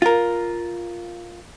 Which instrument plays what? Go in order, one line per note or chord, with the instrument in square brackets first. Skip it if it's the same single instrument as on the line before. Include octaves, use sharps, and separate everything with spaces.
[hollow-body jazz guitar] F4 A#4